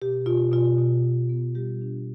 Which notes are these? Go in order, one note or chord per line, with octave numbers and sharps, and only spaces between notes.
B2 G4
B2 F4
B2 F4
B2
B2
B3
G3 G4
D4